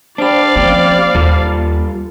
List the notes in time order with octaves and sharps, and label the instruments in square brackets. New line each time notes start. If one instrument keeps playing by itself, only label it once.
[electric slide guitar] D4 G4 [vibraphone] C5 B5 [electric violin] D5 F5
[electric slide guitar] F2 G4 [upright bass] A#3 C#4
[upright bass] D#2 [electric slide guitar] G3 F4 A4